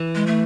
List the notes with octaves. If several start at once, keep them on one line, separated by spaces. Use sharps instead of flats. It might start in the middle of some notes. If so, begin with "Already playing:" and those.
Already playing: E3
G#3
A3